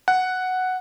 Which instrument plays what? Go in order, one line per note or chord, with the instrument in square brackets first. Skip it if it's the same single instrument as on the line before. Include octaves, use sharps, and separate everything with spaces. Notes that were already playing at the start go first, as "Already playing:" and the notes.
[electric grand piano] F#5